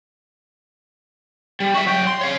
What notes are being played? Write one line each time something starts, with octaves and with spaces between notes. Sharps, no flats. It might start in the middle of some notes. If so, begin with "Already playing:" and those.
G3
F#4 E5
F#3 G5
C6
C#5 F5